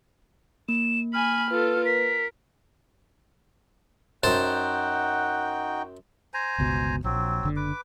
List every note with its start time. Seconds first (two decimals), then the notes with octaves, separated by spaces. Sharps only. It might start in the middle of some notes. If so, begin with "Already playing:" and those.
0.69 A#3 E7
1.13 G#5 B5 F6
1.50 F4 A4 B4
1.85 A#4 B6
4.24 F#2 D#4 F#4 C5 F#5 G5 A5
6.34 C5 G#5 A#5
6.58 G1 C#2 B2
7.04 A#1 F#3 C4
7.43 F#1 D3
7.56 B4 D6